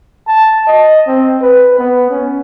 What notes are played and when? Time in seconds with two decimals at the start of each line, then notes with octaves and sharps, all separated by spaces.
0.28 A5
0.67 D#5
1.07 C4
1.42 B4
1.79 B3
2.10 C#4